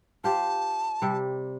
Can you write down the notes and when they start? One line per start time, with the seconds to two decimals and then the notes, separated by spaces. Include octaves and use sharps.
0.24 F4 G4 C5 A5
1.02 C3 G3